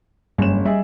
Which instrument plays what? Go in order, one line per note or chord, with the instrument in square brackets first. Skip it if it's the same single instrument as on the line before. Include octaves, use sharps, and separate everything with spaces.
[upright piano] F#1 C#4 E7 [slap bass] G2
[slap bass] G3 [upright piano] G#4 D#5 E5